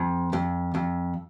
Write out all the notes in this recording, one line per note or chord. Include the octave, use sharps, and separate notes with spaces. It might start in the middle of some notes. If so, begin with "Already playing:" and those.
Already playing: F2
F2
F2